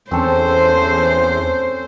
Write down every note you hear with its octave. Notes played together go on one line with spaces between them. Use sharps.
E2 C4 C#4 A4 C5